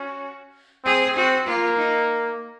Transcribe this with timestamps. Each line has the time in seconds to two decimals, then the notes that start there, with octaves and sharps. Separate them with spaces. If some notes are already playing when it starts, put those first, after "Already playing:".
Already playing: C#4 F#4
0.85 C4 G#4
1.16 C4 F#4
1.47 A#3 F4
1.78 D#4